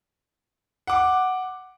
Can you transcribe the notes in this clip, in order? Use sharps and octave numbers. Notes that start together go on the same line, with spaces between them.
F#5 D6